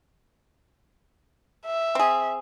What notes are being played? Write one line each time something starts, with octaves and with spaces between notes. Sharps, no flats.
E5
C4 G#4